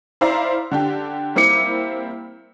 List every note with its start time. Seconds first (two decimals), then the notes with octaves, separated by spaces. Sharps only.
0.21 E4 C5 D5 F5 A#5
0.71 D3 D4 G4
1.35 G3 A#3 C4 E4 D6 C#7